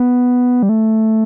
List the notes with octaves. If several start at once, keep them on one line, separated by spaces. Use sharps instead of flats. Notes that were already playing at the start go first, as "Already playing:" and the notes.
Already playing: B3
G3
A3